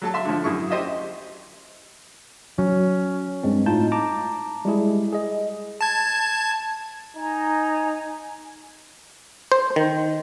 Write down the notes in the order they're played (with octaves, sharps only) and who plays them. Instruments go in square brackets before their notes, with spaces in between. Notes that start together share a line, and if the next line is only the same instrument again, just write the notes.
[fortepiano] F#3 A4 A5
E5 F5 C6
D3 F3
F#2 E4 G#4 C#6
G4 C5 D#5 E5
[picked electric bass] F#3 [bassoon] C#4
[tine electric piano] G2 G#3 C4
A2 D#4 F4 A5 G6
A5 A#5 D6
G3 G#3 E4 G#4
G#4 D#5
[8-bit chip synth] A5 G#6
[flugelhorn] D#4 [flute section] G#5 A#5 G#6
[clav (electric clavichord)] C5
D#3